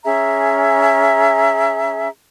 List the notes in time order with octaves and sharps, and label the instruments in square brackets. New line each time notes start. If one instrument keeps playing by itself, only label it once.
[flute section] C#4 G#4 E5 A#5